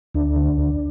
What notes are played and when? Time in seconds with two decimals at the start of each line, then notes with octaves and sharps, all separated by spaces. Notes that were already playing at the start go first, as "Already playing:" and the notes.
0.15 D2 D4
0.36 D3
0.58 D2